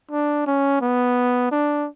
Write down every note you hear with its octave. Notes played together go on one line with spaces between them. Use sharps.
D4
C#4
B3
D4